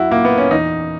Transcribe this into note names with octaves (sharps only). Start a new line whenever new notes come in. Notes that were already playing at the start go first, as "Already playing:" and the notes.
Already playing: F#2 F#3 E4 F#4
A#2 A#3
B3
C#4
E2 D#4